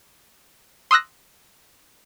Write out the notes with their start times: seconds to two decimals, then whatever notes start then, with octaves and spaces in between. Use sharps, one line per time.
0.91 C6 D#6 E6 F#6 A#6